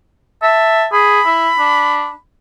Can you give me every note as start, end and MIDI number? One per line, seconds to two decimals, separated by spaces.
0.43 0.87 76
0.43 0.87 81
0.93 1.21 68
0.93 2.17 83
1.26 1.49 64
1.59 2.10 62